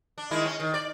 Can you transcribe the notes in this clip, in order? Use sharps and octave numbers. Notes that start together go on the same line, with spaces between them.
D4
D#3 G#3 E4
C#4
D#3
D5